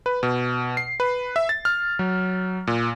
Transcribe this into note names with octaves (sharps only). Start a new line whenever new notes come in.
B4
B2
C7
B4
E5
A6
F6
F#3
A#2